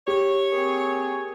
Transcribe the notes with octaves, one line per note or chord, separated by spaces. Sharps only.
G4 C#5
A#3 C4 G#4